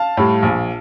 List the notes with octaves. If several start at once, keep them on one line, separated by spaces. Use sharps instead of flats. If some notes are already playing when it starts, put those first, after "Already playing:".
Already playing: F5 A5
A2 G3
A#1